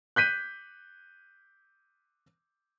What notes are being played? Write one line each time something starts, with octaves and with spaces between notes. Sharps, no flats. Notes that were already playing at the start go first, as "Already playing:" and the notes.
F#6 G6 B6 D#7